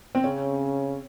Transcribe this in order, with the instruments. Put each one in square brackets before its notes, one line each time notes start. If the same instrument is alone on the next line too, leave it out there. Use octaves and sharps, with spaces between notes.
[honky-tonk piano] C4
[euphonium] C#3 [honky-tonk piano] C#4